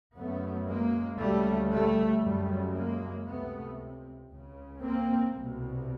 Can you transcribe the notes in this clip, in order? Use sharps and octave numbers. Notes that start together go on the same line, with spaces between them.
F#2 C#3 A3 B3
G#3 A#3
D2 C#3 G3 A3
G3 A3
F#2 C#3 G3 A3
G#3 A#3
C#2 C3 A3 B3
C#2 C#3
A#3 C4
C2 B2